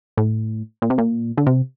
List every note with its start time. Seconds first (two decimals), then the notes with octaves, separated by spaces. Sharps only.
0.17 A2
0.82 A#2
0.90 C3
0.98 A#2
1.38 D3
1.47 C3